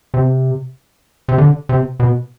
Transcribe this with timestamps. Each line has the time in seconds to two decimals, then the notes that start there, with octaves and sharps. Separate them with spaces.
0.14 C3
1.29 C3
1.38 D3
1.69 C3
2.00 B2